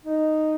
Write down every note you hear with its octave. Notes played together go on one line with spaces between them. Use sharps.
D#4